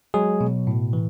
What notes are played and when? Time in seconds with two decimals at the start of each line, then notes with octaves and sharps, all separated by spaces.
0.14 F#3 G#3 G#4
0.41 B2
0.67 A2
0.93 E3